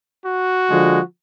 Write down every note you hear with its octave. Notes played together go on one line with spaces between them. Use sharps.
F#4
D3 F3 G#3